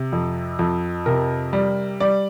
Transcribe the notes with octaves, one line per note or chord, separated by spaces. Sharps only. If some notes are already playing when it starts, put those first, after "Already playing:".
Already playing: C3
F2
F2
C3 A#4
G3
G3 D5